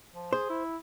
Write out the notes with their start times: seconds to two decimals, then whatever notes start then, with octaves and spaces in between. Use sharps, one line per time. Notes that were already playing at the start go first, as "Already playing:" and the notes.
0.14 F3
0.33 G#4 C5
0.50 E4